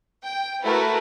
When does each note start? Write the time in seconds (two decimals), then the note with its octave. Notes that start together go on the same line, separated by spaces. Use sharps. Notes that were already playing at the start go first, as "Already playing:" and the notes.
0.23 G5
0.63 A3 E4 F#4 A#4 B4